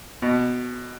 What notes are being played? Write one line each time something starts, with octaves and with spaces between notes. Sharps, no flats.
B2